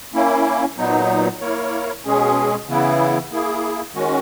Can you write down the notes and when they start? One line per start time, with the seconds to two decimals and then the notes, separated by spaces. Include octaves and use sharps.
0.14 A#3 C#4 E4
0.77 A#2 F#3 B3 D#4
1.40 A#3 E4 A#4 C#5
2.05 B2 G#3 C#4 G#4
2.67 C#3 E3 B3 E4
3.31 A#3 E4 G#4
3.94 D#3 G#3 C#4 F#4